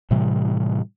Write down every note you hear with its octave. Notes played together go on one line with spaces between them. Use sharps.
A2 C3 E3 G3